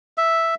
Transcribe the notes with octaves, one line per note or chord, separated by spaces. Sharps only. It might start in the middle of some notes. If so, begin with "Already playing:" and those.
E5